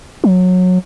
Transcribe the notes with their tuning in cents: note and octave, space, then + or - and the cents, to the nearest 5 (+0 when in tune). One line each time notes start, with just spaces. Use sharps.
F#3 -20